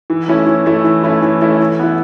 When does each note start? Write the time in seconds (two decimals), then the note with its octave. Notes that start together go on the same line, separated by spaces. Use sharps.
0.10 E3
0.28 A3 C#4 E4
0.47 E3
0.66 A3 C#4 E4
0.84 E3
1.03 A3 C#4 E4
1.22 E3
1.42 A3 C#4 E4
1.60 E3
1.79 B3 E4